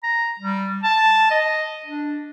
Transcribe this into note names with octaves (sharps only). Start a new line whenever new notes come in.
A#5
G3
A5
D#5
D4